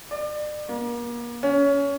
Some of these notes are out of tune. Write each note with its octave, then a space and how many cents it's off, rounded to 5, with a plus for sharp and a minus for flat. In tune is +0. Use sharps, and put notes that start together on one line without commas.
D5 +35
A#3 +35
C#4 +20